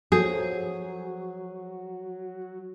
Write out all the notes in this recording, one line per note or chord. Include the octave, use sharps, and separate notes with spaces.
F3 F#3 F#4 G#4 A4